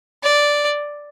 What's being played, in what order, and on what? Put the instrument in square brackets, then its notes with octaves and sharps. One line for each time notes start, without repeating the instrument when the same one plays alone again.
[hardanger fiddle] D5